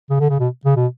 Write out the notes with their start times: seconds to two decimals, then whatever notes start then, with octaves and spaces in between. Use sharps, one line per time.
0.10 C#3
0.20 D3
0.29 C#3
0.39 B2
0.65 C#3
0.76 B2